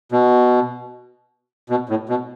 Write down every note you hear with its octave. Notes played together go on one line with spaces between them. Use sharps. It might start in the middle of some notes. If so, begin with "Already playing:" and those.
B2
B2
A2
B2